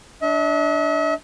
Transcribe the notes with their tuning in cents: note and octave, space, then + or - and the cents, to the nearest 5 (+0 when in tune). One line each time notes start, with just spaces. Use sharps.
D4 -5 E5 -45